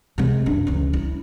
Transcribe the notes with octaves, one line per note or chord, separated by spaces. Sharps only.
C3 G#3
F#2 D4
C#2 E3
E4